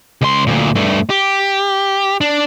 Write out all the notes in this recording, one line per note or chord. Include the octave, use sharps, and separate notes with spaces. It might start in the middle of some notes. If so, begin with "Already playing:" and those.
C#2 C6
D2 A#2
G2 A3
G4
D4